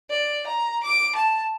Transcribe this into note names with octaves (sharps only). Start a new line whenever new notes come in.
D5
A#5
D6
A5